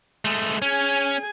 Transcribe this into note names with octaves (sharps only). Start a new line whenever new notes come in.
G#3 A3
C#4 G#4 G#5